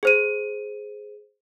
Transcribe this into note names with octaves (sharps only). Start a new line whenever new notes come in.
G#4 C5 D#7